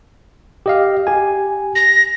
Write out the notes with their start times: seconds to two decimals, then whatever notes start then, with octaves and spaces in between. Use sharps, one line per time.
0.66 G4 D#5 F5
1.07 G4 G#5
1.75 A#6